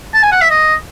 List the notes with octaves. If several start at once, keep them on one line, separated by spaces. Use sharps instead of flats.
A5
G#5
F#5
E5
D#5